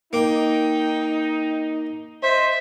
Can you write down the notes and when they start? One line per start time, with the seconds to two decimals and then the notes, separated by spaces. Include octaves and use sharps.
0.13 A#3 D#4 G5 D6
2.23 C5 D#5 E5